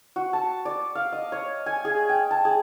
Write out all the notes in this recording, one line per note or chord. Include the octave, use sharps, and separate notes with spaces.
F#4
A5
D5
F5
D#5
C#5
G#5
G#4
G5
A5
G#4